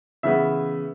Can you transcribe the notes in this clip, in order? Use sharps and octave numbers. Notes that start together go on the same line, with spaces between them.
C#3 E3 B3 E5